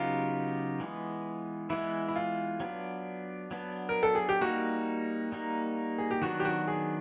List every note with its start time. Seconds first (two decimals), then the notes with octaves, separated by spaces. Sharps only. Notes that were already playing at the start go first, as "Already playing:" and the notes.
Already playing: C#3 F#3 B3 D#4 F4 G4
0.80 E3 G#3 B3
1.70 E3 G#3 B3 E4
2.08 E4
2.16 F4
2.60 F#3 B3 D4
3.51 F#3 B3 D4
3.89 A#4
4.03 A4
4.15 G#4
4.29 G4
4.41 G3 A#3 D#4 F#4
5.32 G3 A#3 D#4
5.98 G#4
6.11 G4
6.22 D#3 F#3 B3 D4 F#4
6.40 G4
6.45 F#4
6.68 G#4